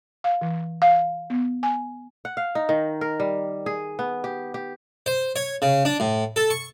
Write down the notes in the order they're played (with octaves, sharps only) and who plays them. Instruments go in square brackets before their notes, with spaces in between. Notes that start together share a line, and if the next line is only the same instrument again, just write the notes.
[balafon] F5
E3
F5
B3
G#5
[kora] F#5
F5
D#4
D#3
A#4
G3
G#4
B3
G4
G4
[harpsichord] C5
C#5
C#3
D4
A2
A4
C#6